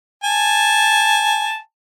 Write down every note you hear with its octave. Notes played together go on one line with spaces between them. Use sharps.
G#5 A5